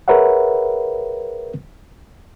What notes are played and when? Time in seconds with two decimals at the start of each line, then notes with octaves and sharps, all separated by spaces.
0.08 G#4 A#4 B4 C#5 E5 F#5